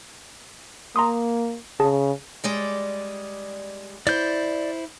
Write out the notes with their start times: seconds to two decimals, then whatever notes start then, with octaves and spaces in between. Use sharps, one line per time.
0.96 A#3 A#5 C6 D#6
1.80 C#3 G#4 A5
2.44 G3 G#3 D5
4.07 E4 C5 D5 G6